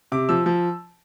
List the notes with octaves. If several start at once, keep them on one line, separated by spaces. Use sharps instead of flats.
C3 D6
F3 E6
F3